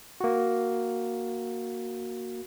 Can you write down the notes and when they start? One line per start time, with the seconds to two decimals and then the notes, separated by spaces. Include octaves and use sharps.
0.20 A#3 F#4